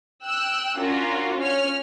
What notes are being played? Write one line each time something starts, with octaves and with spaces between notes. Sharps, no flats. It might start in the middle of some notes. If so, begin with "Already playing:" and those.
G5 E6 F#6
C#4 D4 F4 F#4 A#4
C#4 C#5 F6